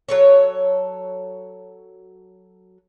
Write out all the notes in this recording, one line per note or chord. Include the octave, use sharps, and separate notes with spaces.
F#3 A4 C#5